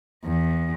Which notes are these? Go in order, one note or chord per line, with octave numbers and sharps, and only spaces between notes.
E2